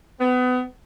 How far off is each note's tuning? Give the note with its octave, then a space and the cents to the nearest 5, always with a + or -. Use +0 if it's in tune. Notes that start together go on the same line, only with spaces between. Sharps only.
B3 +30